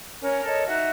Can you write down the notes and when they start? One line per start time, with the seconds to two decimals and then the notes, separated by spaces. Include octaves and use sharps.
0.21 C#4 A#4 C#5
0.44 A4 A#4 C#5 D#5
0.66 D#4 F#4 E5 F#6